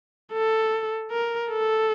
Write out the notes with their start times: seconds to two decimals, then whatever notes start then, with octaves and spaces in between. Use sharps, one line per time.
0.33 A4
1.11 A#4
1.51 A4